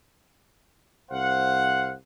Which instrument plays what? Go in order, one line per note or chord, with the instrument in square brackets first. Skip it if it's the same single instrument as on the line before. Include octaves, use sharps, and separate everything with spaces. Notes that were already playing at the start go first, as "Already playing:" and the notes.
[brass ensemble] C2 C5 F5 F#5